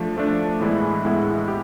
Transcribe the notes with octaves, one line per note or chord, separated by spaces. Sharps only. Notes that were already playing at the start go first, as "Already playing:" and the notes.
Already playing: F3 A3 D4
F3 A3 D4
A2 E3 G#3 B3 E4
A2 E3 G#3 B3 E4
G4